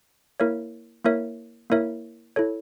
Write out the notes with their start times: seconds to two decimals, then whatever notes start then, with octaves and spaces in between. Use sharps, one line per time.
0.40 A#3 E4 A#4 C#5 E5
1.04 A#3 E4 A#4 C#5 E5
1.70 A#3 E4 A#4 C#5 E5
2.36 E4 A4 C#5